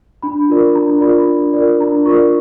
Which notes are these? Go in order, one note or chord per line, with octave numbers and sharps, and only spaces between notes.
D4 B5
F4 A#4 D5
D4 A#5
F4 A#4 D5 B5
D4
F4 A#4 D5
D4 A#5
F4 A#4 D5 C#6